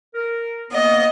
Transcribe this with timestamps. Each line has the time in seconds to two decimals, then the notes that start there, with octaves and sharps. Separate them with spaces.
0.15 A#4
0.71 A#3 B3 D#5